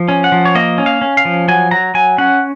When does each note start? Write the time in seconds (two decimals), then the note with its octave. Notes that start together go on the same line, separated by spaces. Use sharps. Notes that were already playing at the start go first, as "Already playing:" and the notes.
Already playing: F3
0.08 C#4
0.24 F#5
0.32 F3
0.45 C#5
0.55 A#3 D#5
0.78 C#4
0.86 F5
1.01 C#4
1.17 F5
1.25 F3
1.48 F#3 G#5
1.71 F#3 A#5
1.94 F#3 G#5
2.18 C#4 F#5